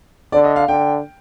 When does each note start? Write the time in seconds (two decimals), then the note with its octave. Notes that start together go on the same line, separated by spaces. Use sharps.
0.32 D3 D5
0.44 D#5
0.56 F5
0.68 D3 G5